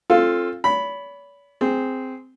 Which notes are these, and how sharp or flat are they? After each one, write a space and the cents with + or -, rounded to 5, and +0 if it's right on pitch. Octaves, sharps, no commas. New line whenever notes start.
C4 +30 F4 +0 A4 +0
C#5 +45 B5 +0
C4 -10 G#4 +0